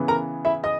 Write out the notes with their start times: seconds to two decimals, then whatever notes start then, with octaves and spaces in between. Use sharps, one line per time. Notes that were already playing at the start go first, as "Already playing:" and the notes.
Already playing: C#3 E3 B3
0.08 A#4 A#5
0.45 E4 E5
0.64 D#5 D#6